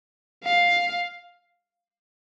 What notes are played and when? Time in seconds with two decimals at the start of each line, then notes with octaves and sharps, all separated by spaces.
0.44 F5